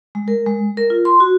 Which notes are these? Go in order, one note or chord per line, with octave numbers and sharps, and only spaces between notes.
G#3
A#4
G#3
A#4
F4
C6
F#4